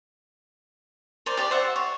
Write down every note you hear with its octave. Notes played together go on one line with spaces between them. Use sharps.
A#4 C5 D5
G4 D5
C5 E5 F#5
C#5